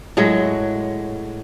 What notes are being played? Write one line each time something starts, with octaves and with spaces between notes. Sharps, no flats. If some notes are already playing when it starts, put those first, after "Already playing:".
A2 F#3 G#3